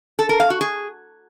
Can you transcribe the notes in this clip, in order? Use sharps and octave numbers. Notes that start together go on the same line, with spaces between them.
A4
A#4
F5
F#4
G#4